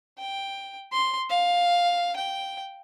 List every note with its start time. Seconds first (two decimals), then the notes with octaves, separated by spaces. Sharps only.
0.18 G5
0.92 C6
1.30 F5
2.16 G5